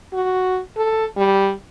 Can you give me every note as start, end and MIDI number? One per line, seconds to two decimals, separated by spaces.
0.13 0.60 66
0.77 1.05 69
1.17 1.52 55